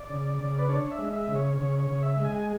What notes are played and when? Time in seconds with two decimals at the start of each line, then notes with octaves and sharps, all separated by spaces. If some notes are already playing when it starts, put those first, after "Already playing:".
Already playing: D5
0.10 C#3
0.39 C#3
0.58 B4
0.69 D4 C#5
0.91 E5
0.98 G#3
1.13 E5
1.28 C#3
1.35 C#5
1.57 C#3 C#5
1.79 C#5
1.87 C#3
2.03 E5
2.16 G#3
2.24 G#5
2.39 G#5